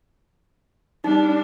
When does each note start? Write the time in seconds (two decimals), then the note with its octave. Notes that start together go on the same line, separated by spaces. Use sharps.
1.04 G3 D4 D#4